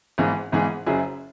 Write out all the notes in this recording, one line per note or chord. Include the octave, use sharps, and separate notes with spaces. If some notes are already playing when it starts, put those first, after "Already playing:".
G#1 G#2 E3 B3 G#4
G#1 G#2 E3 B3 G#4
F#1 F#2 F#3 E4 G#4